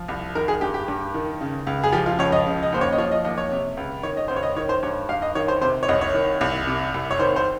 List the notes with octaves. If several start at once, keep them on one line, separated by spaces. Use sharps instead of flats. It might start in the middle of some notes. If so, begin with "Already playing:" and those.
Already playing: F3
C2
D#3 A#4
G#4
G2 G4
G4
G2
D#3
C#3
C#2
G#4
F3 G4
F4
C#2 C#5
D#5
C#3
D#5
D#2 C5
C#5
D#5
F3 C#5
D#5
D#2 D#5
C#5
C3
C#2
D#3 C#5
D#5
C#2 C5
C#5
D#5
D#3 C#5
C5
G2 C#5
G2 F5
D#5
D#3 C#5
C5
C3 C5
C#5
C2 D#5
C#5
D#3
C2
C3
C2
C#5
D#3 C5
C5